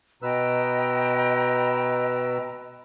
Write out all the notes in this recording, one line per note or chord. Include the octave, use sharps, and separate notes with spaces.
B2 B4 D#5 G5 A#5 E6